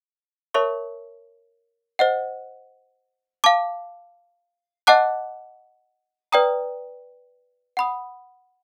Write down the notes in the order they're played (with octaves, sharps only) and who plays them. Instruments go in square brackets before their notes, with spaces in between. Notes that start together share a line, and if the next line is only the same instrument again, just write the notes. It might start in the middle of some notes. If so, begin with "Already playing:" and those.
[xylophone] A#4 C#5 E5 A5 C#6
C5 D#5 F#5
F5 A5 D6
D#5 F#5 A5 D6 F#6
B4 D5 G5 A#5 D#6
F#5 B5 D#6